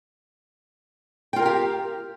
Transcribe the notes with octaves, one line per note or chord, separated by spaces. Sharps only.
F4 G4 A#4 F5 G5